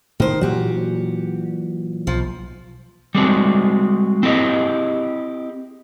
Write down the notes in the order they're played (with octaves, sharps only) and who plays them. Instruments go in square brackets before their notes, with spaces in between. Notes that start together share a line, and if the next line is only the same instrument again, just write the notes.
[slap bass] A2 [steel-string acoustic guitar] D#3 C5
[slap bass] A#2 E3 F#3 [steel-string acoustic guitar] F#4 G4
[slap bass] B1 [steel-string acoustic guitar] F3
[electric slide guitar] G3 G#3 C4 F#4
C4 E4 G4 G#4 D#5